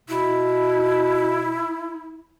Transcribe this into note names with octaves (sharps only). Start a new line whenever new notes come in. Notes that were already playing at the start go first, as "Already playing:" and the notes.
B2 E4